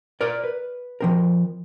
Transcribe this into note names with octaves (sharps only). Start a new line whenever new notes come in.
A#4 D5
B4
F3 C4 A#4